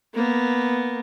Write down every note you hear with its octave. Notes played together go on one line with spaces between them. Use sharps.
A#3 B3